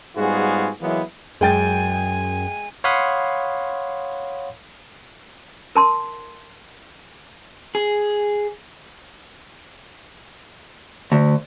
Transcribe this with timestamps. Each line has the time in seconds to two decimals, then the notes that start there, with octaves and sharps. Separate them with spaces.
0.16 G#2 G3 B3 F4 F#4 G#4
0.81 E3 F#3 G#3 A#3 B3 E4
1.41 F#2 G#3 G5 G#5 A6
2.84 C#5 F5 F#5 B5 C6 D#6
5.76 A#4 A5 C6
7.75 G#4
11.12 D2